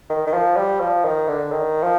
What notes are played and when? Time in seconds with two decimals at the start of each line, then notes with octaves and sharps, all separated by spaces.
0.10 D#3
0.27 D#3
0.33 F3
0.57 G3
0.81 F3
1.04 D#3
1.28 D3
1.52 D#3
1.83 F3